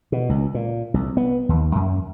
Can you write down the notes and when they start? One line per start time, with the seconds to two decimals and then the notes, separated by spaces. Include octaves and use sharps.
0.12 B2
0.29 C#2
0.54 A#2
0.94 C2
1.17 B3
1.49 D#2
1.75 F#2